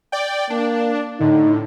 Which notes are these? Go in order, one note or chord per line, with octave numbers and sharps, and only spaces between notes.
D5 G5
A#3 D4
A2 D3 D#4